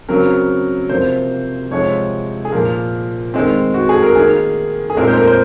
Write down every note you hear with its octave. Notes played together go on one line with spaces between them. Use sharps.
C#3 F#3 C4 A#4
C3 F3 A#3 C5
C3 F3 G#3 C4 C#5
G#4
A#2 F3 A#3 A#4
D#3 G#3 C4
F#4
G#4
A#4
D#3 A#3 G#4
G#4
A#2 G#3 C4 A#4
C5
A#4
C5